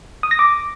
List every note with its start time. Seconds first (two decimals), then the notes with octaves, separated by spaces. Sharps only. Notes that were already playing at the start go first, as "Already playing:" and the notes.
0.23 D#6
0.31 A#6
0.39 D6